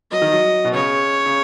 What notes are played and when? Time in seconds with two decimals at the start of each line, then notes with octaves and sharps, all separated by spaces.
0.11 F#3 D#5
0.22 D#3
0.32 F#3
0.64 B2
0.74 C#3 C#5
1.26 C#3